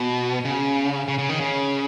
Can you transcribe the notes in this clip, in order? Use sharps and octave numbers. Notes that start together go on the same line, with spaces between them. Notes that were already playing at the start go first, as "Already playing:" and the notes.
Already playing: B2
C#3
C#3
C#3
D#3
C#3